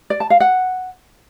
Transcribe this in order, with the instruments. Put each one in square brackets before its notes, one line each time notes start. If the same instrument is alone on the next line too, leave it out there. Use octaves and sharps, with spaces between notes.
[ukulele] D5
A5
F5
F#5